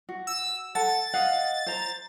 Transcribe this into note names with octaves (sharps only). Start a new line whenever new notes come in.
F#4
E6
A4 F#5 A5 A6
D#5 F5 F#5
C5 A#5